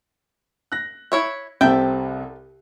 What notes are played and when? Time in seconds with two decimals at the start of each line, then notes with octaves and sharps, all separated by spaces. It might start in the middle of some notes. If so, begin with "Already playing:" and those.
0.72 F#6 A#6
1.12 E4 C#5 E5
1.61 C2 C3 A4 E5 G5